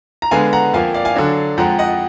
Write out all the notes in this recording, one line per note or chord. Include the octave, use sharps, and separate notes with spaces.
A#5
D3 G#3 B3 F5 G#5
F#5 A#5
F2 F3 A#3 F5 G#5
D5 F5
F5 G#5
D3 F#3 D4
F2 F3 G#3 F#5 A#5
D#5 F#5